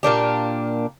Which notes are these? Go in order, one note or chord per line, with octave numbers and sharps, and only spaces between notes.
A#2 A#3 D4 G4